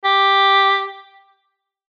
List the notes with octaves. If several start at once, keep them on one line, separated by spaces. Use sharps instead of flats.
G4